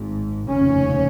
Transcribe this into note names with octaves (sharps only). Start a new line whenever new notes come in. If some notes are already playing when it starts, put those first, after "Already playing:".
Already playing: G#1 G#2
F1 D#2 C#3 C#4